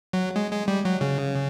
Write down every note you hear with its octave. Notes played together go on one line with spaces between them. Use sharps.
F#3
G#3
G#3
G3
F#3
C#3